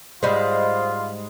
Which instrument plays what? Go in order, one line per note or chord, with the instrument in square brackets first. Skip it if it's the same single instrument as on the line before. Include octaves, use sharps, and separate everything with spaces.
[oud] G#2 G3 G#3 [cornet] F4 [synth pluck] C5 D#5 B5